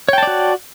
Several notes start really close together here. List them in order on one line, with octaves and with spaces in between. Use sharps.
C#5 G5 A5 D5 F#4